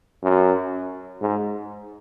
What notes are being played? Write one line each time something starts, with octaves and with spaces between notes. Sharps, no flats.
F#2
G#2